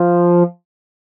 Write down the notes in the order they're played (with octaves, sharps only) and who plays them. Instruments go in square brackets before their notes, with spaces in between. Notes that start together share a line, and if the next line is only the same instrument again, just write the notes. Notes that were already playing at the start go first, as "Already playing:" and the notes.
Already playing: [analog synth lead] F3